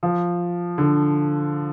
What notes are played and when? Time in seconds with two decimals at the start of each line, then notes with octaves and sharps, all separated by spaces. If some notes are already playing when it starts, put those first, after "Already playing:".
0.03 F3
0.78 D3